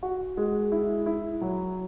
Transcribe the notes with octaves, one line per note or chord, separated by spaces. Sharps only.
F#4
G#3
E4
E4
F#3